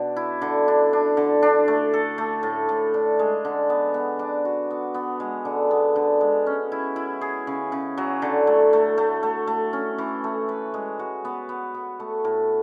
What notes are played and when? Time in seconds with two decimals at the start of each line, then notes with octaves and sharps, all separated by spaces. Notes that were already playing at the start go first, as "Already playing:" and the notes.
Already playing: B2 D4
0.16 E4
0.42 D3
0.68 D4
0.93 D4
1.17 D3
1.43 D4
1.68 A3
1.93 A4
2.18 A3
2.43 A2
2.69 A2
2.94 D4
3.19 G#3
3.45 D3
3.70 B3
3.94 B3
4.19 D4
4.45 F#4
4.70 B3
4.94 B3
5.20 G#3
5.45 D3
5.71 B3
5.96 D3
6.21 G#3
6.46 C#4
6.72 E4
6.96 E4
7.21 G#4
7.47 C#3
7.72 C#3
7.98 F#3
8.22 D3
8.47 A3
8.73 A3
8.98 A3
9.23 A3
9.47 A3
9.73 C#4
9.98 E3
10.24 A3
10.49 B4
10.74 G#3
10.99 F#4
11.25 B3
11.49 B3
11.74 B3
12.00 A3
12.25 A2